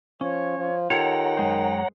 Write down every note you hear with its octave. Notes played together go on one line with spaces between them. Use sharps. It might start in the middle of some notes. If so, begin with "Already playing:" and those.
F3 C#4 C#5
F3
D#3 F4 G4 A4 C#5 F#5 G5 A#5
F#2 G#3 C5